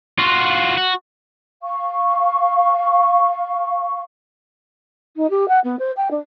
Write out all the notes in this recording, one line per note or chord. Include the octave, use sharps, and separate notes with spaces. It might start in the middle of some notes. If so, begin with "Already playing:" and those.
F4 F#4
F#4
F5 C#6
D#4
G4
F#5
B3
C5
G5
D4